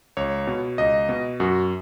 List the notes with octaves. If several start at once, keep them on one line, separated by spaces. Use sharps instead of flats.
C#2 C#5
B2
C#2 D#5
B2
F#2 F#4